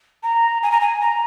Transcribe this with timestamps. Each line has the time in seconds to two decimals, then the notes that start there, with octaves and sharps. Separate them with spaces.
0.23 A#5
0.62 G#5
0.71 A#5
0.80 G#5
1.01 A#5